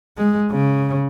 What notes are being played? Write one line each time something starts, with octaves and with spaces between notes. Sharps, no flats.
G#3
C#3